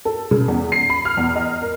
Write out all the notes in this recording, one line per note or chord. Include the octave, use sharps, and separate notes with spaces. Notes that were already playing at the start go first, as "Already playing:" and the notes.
A4
C#3
E2
C7
B5
F6
E2
D#5
A#4